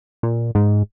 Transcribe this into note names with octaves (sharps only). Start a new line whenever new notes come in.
A#2
G#2